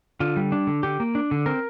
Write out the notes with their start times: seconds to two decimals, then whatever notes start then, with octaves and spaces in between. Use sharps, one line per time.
0.20 D3 F4
0.36 G3
0.52 D4
0.67 D3
0.83 D3 G4
1.00 A#3
1.15 D4
1.31 D3
1.46 C4 A#4